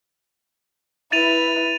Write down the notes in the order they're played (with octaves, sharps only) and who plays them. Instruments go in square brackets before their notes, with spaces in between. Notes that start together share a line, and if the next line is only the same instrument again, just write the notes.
[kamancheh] E4 B4 [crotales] A6 D#7 F7